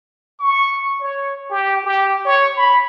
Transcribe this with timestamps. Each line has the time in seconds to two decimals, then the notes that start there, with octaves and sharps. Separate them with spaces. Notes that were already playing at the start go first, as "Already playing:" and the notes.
0.40 C#6
1.00 C#5
1.50 G4
1.84 G4
2.25 C#5
2.56 B5